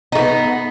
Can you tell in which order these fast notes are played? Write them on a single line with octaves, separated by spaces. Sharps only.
D#4 A3 B3